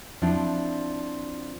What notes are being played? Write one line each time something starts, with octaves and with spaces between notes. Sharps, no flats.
F3 C4 D4 E4